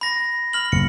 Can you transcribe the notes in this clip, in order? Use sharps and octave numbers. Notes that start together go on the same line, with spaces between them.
B5 A#6
B5 F6 F#7
F#1 C#7